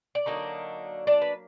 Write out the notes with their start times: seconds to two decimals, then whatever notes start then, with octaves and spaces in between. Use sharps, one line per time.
0.15 D5
0.26 D3 F#3 A#3 D4 D#4 D#5
1.07 D4 D5
1.22 B4